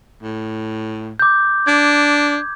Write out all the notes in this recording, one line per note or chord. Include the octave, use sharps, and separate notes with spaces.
A2
D6 G6
D4 G#6